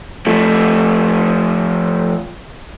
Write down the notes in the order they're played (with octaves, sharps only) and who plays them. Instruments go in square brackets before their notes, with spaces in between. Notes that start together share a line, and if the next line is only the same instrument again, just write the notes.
[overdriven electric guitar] F3 A3